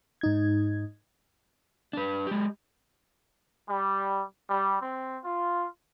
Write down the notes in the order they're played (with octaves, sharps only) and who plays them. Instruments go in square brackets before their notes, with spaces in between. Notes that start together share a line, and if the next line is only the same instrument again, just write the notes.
[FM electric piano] G#2 D#4 G#6
[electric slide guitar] D4 B4
G#3 G4
[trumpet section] G3
G3
C4
F4